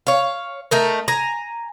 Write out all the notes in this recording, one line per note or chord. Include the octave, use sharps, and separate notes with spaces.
C#5 F5
A3 D#4 A#4
G#5 A#5